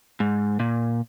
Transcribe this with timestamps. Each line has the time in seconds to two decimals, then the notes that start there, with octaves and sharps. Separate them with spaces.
0.20 G#2
0.60 A#2